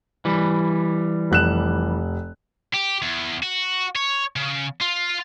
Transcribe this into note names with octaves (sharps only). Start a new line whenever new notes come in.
E3 G3
F1 F#6 E7
G4
E2
F#4
C#5
C#3
F4